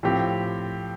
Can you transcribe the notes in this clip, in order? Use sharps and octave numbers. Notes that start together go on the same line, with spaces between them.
A2 F3 C4 G4